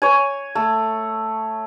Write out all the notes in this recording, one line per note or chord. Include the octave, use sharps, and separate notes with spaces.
C#5 G#5
A3